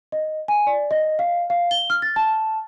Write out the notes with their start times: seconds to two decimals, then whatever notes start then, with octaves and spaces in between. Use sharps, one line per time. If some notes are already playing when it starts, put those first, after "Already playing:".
0.12 D#5
0.48 G#5
0.67 D5
0.91 D#5
1.19 F5
1.50 F5
1.71 G7
1.90 F6
2.02 A6
2.16 A5